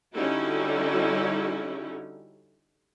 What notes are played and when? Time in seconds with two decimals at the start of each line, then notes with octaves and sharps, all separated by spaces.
0.15 D3 G3 C#4 D#4 E4 F#4